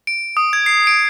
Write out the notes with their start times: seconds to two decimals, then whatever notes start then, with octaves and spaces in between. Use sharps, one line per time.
0.07 D7
0.37 D#6
0.53 G#6
0.66 C7
0.87 D7